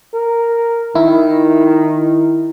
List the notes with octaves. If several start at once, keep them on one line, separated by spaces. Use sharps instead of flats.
A#4
D#3 E4